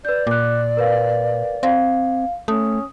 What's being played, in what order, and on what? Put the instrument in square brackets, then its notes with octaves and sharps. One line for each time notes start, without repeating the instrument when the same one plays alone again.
[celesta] B4 G6 [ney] D5
[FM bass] A#2 [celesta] D6 F#6
[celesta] A#4 B4 F5
[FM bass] C4 [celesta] F5
[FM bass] A3 [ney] C#4 [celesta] D#6